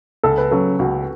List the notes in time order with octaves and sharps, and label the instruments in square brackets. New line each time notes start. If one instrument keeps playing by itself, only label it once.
[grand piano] C#2 [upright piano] A4
[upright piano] B4
[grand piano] C#3 F#3 [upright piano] A4
[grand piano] C#2 [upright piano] F#4